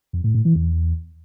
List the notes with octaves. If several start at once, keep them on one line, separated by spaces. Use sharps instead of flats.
F2
A2
A2
E3
E2